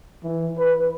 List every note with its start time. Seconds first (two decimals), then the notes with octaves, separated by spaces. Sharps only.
0.22 E3
0.57 B4